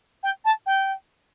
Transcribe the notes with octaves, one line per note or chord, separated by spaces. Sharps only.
G5
A5
G5